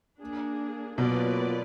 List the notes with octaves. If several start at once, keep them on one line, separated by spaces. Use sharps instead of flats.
A#3 D4 G#4
B2 F#3 A#3 F4 B4 D5